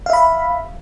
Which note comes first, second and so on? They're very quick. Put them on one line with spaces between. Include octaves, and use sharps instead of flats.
F5 E5 B5